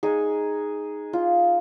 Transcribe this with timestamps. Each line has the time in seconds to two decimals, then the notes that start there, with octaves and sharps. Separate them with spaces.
0.03 G#3 D#4 G#4
1.13 F4